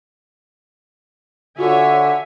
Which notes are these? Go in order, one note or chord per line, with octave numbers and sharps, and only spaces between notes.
D3 F4 F#4 A4 C#5 E5 G#5